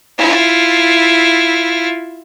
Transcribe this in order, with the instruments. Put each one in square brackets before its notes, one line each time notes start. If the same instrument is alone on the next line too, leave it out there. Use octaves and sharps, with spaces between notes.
[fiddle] E4 F4